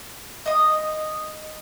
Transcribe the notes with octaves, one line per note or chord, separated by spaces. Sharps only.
D#5 D#6